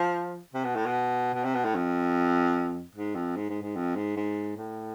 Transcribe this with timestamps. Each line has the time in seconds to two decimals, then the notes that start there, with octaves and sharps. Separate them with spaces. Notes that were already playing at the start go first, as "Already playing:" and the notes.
Already playing: F3
0.54 C3
0.65 B2
0.76 A2
0.86 B2
1.34 B2
1.44 C3
1.55 B2
1.65 A2
1.75 F2
2.95 G#2
3.15 F2
3.36 G#2
3.49 G#2
3.62 G#2
3.76 F2
3.96 G#2
4.17 G#2
4.57 A2